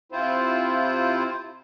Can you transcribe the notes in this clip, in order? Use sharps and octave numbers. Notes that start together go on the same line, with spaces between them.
C3 C4 E4 F4 C5